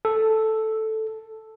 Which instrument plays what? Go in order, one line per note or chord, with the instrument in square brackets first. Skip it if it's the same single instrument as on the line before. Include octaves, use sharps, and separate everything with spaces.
[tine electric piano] A4